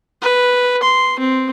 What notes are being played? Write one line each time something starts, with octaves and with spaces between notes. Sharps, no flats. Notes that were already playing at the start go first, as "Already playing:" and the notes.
B4
C6
C4